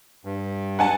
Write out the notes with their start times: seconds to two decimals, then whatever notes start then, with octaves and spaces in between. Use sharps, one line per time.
0.25 G2
0.79 F#5 G#5 A5